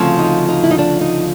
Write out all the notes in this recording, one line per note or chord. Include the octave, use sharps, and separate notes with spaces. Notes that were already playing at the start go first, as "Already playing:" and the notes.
Already playing: D2 C#3 F3 C4
D#4
D#4
E4
D#4
D4
D#4